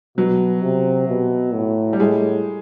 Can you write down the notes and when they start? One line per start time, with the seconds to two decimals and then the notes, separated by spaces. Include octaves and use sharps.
0.17 B2 F#3
0.63 C3
1.08 B2
1.54 A2
1.93 G3
1.99 A2 G#3